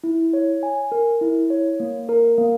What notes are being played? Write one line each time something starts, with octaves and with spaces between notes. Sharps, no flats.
E4
C#5
G#5
A#4
E4
C#5
A#3
A#4
A#3